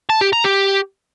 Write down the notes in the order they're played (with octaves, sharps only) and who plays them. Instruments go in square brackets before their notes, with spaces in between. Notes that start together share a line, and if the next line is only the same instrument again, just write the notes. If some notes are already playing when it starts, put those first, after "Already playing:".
[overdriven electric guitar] A5
G4
A#5
G4